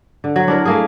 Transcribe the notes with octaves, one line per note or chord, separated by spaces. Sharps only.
D3
F#3
D4 E4 A#4
A3 A#3 G#4